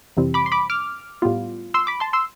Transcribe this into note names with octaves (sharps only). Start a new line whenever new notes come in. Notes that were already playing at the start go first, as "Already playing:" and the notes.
F2 C3 E3 G3 C4
B5 D6
C6
B5 D6
D6 F6
A2 G3 B3 F4
C6 E6
B5 D6
A5 C6
C6 E6